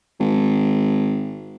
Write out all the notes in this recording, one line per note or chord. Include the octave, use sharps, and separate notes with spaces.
G#1